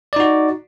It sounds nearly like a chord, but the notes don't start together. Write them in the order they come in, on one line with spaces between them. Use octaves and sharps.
D5 D#4 F#4